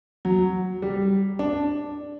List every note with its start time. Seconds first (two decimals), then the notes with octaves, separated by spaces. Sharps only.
0.25 F#3
0.82 G3
1.39 D4